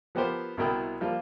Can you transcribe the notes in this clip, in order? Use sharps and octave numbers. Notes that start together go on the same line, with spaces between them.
F3 B3 G4 A#4 C5
C2 B2 E4 A#4 G5 D#6
F3 G3 A#3 F4